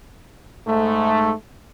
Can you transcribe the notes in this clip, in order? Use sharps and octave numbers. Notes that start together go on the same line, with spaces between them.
G#2 A3